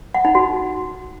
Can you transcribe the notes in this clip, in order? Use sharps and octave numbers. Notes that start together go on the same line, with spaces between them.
F#5
D#4
F#4